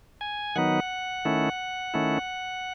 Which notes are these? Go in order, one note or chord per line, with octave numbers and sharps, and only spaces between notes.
G#5
D#3 F#3 B3 D#4 F#5
D#3 A3 C#4 E4
D#3 A3 C#4 E4